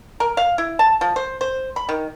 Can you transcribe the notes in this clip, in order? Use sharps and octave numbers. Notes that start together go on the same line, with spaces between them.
A#4
F5
E4
A5
F3
C5
C5
B5
D#3